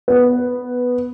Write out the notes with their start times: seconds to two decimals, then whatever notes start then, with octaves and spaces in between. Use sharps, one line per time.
0.08 B3